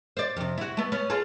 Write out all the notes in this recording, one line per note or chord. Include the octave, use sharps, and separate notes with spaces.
C5 D5
F2 C3
E4 F#4
A3 B3
B3 C#4
F4 G#4 A4